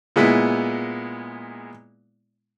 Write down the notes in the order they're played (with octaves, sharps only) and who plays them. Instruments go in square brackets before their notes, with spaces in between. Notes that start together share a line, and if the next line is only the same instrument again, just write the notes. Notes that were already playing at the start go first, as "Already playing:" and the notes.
[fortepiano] A#2 G#3 B3 E4